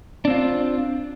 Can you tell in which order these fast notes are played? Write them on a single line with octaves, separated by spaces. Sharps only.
D4 C4 F4